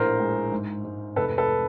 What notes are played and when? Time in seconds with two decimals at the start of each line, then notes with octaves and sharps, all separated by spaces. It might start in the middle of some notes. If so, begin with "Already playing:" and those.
Already playing: A#1 A2 A#4 C5
0.20 G#3
0.52 G#2
0.84 G#2
1.16 F1 A4 B4
1.38 A4 B4